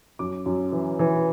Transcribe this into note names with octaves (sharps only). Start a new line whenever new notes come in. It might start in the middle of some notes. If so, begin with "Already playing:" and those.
F#2 D6
F#2
E3
E3